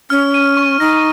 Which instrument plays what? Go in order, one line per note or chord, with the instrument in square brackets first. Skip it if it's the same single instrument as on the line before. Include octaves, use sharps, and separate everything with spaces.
[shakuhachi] C#4 [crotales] F6
[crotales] D#7
C#6
[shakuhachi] D#4 [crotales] A#6